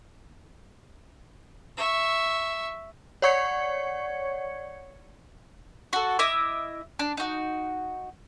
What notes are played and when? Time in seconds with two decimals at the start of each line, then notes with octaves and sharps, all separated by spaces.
1.77 E5 C#6
3.22 C#5 D5 F#5 C#6 G#6 C#7
5.93 F#4 A4
6.19 E4 D#5 E5 D6
6.99 D4
7.17 D#4 F#4